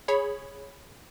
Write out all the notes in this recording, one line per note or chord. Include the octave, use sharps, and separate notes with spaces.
G#4 C#5 B5